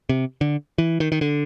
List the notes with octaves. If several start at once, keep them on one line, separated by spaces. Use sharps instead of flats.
C3
D3
E3
D#3
D#3
D3